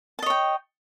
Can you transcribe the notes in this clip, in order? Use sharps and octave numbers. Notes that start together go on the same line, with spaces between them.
C#5 D#5 G5 A5